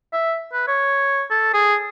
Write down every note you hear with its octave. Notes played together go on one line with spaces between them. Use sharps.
E5
B4
C#5
A4
G#4